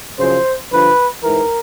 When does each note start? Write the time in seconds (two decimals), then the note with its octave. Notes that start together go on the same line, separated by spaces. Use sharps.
0.19 F#2 C#3 F3 C5
0.71 G2 D3 F3 B4
1.23 G#2 E3 A#4